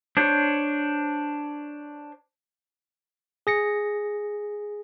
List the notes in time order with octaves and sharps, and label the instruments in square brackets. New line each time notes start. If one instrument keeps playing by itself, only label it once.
[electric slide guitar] D4 C5 C#5
[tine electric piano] G#4 A#6 C#7